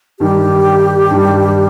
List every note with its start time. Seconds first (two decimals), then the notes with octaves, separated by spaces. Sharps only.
0.20 G2 D#3 G3 G4
1.11 G2 D#3 G3